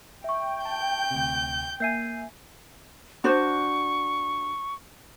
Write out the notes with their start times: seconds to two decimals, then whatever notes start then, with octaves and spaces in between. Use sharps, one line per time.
0.24 E5 G5 C#6
0.65 A5 G6
1.11 D2 C3
1.80 A#3 E5 G#5 G6 C7 D#7
3.24 D4 F#4 C5 C#6